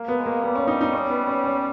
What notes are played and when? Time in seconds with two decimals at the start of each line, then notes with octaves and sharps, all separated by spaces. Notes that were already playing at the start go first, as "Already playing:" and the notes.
Already playing: A#3
0.08 B3
0.17 G#3
0.26 A#3
0.42 G3 B3
0.55 C#4
0.67 G3 D#4
0.81 D#4
0.93 C#4
1.10 B3
1.27 C#4
1.44 C#4